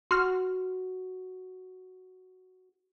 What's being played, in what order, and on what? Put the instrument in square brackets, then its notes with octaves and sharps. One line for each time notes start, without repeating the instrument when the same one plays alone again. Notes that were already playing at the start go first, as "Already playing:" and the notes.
[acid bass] F#4 [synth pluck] C6 F6